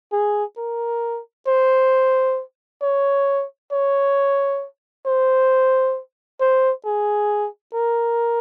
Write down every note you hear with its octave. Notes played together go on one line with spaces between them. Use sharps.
G#4
A#4
C5
C#5
C#5
C5
C5
G#4
A#4